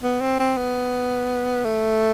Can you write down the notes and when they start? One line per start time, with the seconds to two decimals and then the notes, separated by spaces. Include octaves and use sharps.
0.03 B3
0.21 C4
0.40 C4
0.57 B3
1.65 A3